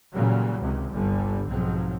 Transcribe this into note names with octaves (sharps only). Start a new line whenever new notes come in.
A#2 C#3 E3 F#3 G3
C#2 C3 D#3
G1 C2 D3 G3
B1 G#2 F3 F#3 C4